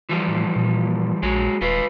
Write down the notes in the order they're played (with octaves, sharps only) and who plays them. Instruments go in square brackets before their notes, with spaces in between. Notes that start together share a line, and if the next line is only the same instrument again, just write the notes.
[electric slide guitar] E3 F3 G3
[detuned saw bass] A2
A#2
[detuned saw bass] A#1 [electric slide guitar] F#3 G#3
[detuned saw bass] D#1 [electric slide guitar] F4 B4